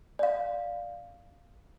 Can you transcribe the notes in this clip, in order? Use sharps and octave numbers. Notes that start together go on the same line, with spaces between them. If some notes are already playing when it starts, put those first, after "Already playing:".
D5 F5